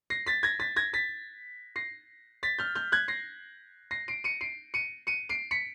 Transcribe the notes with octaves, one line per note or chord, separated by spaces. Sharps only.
A#6 C7
A6 B6
G#6 A#6
A6 B6
G#6 A#6
A6 B6
A#6 C7
A6 B6
F6 G6
F6 G6
F#6 G#6
A#6 C7
A#6 C7
C7 D7
C#7 D#7
C7 D7
C#7 D#7
C#7 D#7
C7 D7
B6 C#7